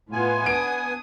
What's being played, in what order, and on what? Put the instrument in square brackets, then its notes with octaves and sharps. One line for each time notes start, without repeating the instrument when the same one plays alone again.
[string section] A2 F4 [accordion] B3 G#5
[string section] D4 D#6 [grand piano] D7